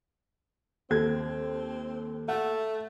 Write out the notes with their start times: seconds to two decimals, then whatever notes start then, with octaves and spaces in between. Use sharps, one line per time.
0.90 D#2 C4 A4 G#6
2.28 A3 F#5